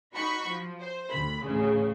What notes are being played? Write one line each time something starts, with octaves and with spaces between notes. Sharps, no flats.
D#4 F#4 B5 C#6
F3
C5
D2 B5
A1 D2 C#3